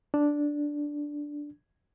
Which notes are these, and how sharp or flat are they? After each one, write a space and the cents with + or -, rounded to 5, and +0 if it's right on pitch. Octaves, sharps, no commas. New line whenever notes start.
D4 -5